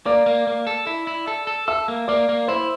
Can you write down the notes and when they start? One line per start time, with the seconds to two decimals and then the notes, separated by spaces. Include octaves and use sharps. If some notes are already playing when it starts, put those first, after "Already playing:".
0.06 A#3 D5 D6
0.26 A#3
0.47 A#3
0.67 A4
0.87 E4
1.07 E4
1.27 A4
1.47 A4
1.68 A4 E5 E6
1.88 A#3
2.08 A#3 D5 D6
2.29 A#3
2.48 E4 C5 C6